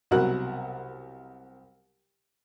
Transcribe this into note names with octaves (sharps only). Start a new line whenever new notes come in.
C2 B2 F#3 A#4 F#5 F#6